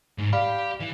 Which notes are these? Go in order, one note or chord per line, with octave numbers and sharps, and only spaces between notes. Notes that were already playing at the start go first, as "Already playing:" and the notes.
G#2
G4 D5 F5 B5
E3